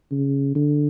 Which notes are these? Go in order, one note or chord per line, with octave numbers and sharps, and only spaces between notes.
C#3
D3